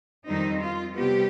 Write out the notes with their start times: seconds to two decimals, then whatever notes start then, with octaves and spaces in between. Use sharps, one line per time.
0.27 F2 D#3 G3 C4 D#4
0.61 F4
0.95 C3 G3 B3 G4